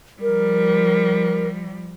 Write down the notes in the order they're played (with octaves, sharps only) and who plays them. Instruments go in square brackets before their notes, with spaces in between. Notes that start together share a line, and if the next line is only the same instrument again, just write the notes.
[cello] F3 G3 [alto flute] A#4